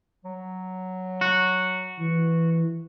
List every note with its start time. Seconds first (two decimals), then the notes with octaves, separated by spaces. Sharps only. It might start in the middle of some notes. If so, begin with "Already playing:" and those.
0.25 F#3
1.21 F#4
2.00 E3